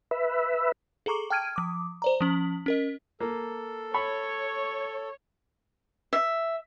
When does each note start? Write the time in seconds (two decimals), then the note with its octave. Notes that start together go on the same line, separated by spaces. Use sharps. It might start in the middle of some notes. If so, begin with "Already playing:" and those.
0.11 B4 E5
1.06 G#4 A4 A#5 C#6 D6
1.30 G5 A5 F6 G#6 D7 D#7
1.56 F3 D6
2.02 C5 D5 A#5
2.21 F3 C#4 F#7
2.66 C#4 A#4 D#5
3.20 A#3 A4
3.94 C#5 B5 C#6
6.13 E5